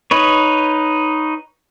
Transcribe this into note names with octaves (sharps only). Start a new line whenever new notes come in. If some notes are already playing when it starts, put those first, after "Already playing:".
D#4 B4 C#5